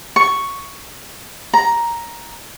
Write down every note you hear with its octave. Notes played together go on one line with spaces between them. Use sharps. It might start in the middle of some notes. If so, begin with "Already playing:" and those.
C#6
A#5